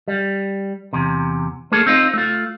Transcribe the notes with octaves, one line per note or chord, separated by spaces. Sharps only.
G3
E2 C3
A3 A#3 G#4 A4
C4 D#4 F4
A3 F4